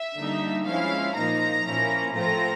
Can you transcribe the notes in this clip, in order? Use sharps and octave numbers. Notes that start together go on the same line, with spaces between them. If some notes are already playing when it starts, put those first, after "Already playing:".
Already playing: E5
D3 G3 A#3 D#4
F3 G#3 C#4 E4 F5
A#2 F3 A#3 D#4 A#5
A#2 F3 A#3 C#4 E4
A2 F3 A3 C4 F4 A#5